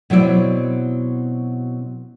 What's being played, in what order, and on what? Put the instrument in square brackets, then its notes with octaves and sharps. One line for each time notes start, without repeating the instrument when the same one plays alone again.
[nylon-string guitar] B2 F#3 C4 E4 D5